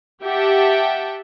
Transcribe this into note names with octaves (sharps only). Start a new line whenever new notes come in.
G4 E5 F#5 G5 A5